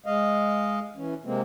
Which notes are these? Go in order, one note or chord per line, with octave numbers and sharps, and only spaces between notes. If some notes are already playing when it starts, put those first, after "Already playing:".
G#3 D#5 F5
E3 C#4
C3 G#3 A#3 C4